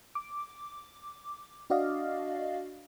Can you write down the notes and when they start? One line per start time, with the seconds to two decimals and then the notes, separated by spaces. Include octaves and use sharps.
0.15 D6
1.70 D4 F#4 D5 D#5 F5